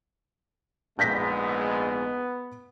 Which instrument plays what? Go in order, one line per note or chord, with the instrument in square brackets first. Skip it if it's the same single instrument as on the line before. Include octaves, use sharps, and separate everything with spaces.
[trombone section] A#1 G#2 G#3 [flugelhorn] B3 [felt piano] G6 A#6 B6